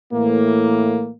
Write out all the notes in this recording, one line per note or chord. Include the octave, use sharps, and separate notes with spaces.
A2 E3 A#3